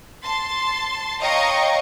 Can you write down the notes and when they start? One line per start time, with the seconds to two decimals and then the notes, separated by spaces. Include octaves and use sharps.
0.25 A5 C6 A6
1.20 C#5 D#5 F5 G5 A#5 C#6